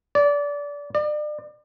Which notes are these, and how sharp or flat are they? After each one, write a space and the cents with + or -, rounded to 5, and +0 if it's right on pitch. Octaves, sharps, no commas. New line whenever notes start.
D5 -25
D5 +35